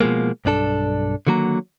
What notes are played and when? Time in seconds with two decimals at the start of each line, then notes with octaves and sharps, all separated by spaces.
0.01 B2 F3 G#3 A#3
0.45 B1 G2 D4 A4
1.27 D3 D#3 F#3 A#3 A#5